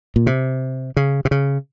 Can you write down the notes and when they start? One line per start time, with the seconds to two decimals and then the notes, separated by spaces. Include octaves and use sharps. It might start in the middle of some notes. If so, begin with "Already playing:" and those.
0.16 A#2
0.27 C3
0.97 C#3
1.25 C3
1.31 C#3